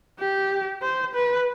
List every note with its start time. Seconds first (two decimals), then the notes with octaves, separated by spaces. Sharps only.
0.20 G4
0.82 C5
1.14 B4